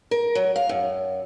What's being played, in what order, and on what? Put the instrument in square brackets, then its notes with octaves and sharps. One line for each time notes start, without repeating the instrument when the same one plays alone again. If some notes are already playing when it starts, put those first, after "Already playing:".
[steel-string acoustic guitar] A#4
F#3
F5
F#2